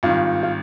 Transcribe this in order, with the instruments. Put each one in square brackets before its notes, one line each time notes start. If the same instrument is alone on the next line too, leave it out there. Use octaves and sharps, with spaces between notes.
[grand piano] G#1 G2 D#3 [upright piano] F4
[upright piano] F4